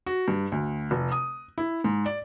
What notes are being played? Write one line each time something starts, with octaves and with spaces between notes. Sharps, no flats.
F#4
G2
D2
F1
D#6
E4
G#2
D5